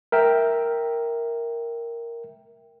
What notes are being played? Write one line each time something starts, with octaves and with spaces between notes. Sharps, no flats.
A#4 E5 G5